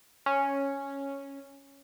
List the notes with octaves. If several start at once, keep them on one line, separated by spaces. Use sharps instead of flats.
C#4